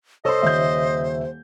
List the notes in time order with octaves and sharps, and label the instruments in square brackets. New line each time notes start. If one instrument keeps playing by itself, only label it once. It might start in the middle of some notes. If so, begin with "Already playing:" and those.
[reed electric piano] C2 C#5 E6 [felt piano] A4 C6 [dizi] C5 [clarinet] D#5
[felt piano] D#1 C#5 G6 [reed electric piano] D#2 C#3 E5